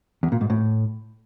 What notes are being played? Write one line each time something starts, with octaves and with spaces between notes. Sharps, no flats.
E2
A#2
G#2
A2